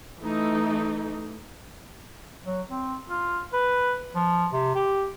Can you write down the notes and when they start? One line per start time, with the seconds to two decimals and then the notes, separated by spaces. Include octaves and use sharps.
0.19 E3 A3 D#4
2.46 F#3
2.70 C4
3.09 F4
3.53 B4
4.15 F3
4.53 C3
4.75 G4